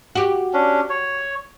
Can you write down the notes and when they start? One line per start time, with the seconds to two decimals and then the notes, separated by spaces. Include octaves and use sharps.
0.15 F#4 G4
0.53 C#4 D4
0.90 C#5